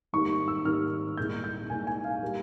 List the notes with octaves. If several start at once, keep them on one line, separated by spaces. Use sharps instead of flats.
G#1 G#2 G3 A#3 C#6
E6
G#1 G#2 G3 A#3 F6
C2 A#2 G#3 G6
G6
C2 A#2 G#3 G#5
G#5
F5
G3 A#3